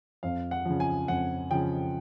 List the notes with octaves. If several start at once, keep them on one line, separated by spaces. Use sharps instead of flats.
F2 F5
F#5
C#3 F3
G#5
F2 F#5
C#3 F3 G5